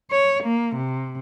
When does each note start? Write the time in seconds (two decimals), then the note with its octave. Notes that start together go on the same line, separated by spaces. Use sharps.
0.11 C#5
0.44 A#3
0.76 C3